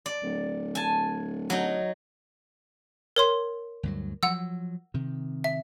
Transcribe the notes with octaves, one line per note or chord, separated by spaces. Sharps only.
D5
D1
G#5 A5
F#3 D#4
A#4 C#5 C6
D2 G2 F#3
F3 F#3 F#5 E6
C3 D#3
E5